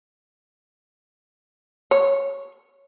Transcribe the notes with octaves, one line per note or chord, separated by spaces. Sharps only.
C#5